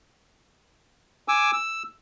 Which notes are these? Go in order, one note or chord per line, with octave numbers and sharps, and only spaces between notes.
G#5 D6 E6
E6